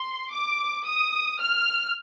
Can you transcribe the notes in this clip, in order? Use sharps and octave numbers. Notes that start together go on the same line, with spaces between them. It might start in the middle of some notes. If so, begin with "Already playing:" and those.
Already playing: C6
D6
D#6
F6